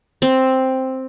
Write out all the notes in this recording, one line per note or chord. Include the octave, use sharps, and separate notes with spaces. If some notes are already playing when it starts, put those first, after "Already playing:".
C4